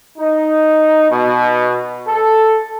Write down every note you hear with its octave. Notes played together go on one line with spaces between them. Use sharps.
D#4
B2
A4